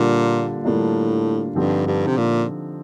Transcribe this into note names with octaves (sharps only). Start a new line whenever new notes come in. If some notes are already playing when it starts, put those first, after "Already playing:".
Already playing: A#2 D3 G3 A#3 D4 F4
A2 D3 G3 A#3 D4 F4
G2 D3 F3 C4 D#4 G4
G2
C3
A#2